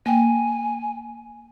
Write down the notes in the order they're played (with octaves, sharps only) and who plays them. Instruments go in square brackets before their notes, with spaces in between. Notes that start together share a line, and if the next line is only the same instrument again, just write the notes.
[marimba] A#3 G5 [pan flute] G#5